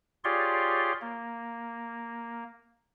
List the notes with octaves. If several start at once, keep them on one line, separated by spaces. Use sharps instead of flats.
F4 G4 G#4 C#5 D5 C6
A#3